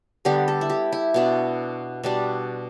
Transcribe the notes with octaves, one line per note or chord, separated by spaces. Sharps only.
D3 G3 B3 G4
A4
E4
G4
E4
B2 B3 D4
B2 G3 D4